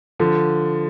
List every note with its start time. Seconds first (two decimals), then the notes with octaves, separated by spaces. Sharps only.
0.20 D3 F3